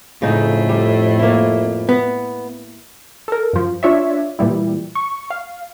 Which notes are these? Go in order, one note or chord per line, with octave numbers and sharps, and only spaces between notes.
F2 A2 C#3 D#4
G3
A#3 E4
B3
A4 A#4
F#2 F3
D4 F4 C#5 D5 E5
A#2 E3 G3 E4
C#6
F5